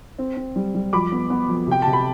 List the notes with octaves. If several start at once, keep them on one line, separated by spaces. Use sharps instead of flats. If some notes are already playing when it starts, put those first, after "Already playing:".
C4
C4
G3
G3
F2 B5 D6
B3
B3
F2
C3 G5
C3 A5
B5